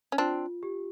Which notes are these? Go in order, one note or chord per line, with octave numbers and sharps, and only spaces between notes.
C#4
C4 D4 F4
G4